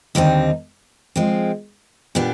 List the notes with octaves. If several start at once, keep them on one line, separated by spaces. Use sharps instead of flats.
D#2 D3 G3 C4 D#4
F3 G#3 C4
A#2 G3 B3 D4